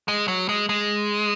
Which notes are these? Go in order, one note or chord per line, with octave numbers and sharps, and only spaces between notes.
G#3
F#3
G#3
G#3